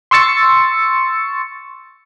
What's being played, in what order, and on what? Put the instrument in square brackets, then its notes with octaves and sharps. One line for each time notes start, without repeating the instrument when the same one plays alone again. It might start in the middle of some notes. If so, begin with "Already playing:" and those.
[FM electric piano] C6 C#6 E6 A6 C#7